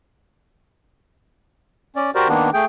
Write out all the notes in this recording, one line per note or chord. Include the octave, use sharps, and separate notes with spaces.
C#4 D5
F#4 G4 A#4 C5 D5
D#3 A#3 B3 D4
A3 G#4 G5